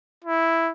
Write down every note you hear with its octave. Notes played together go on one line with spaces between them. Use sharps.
E4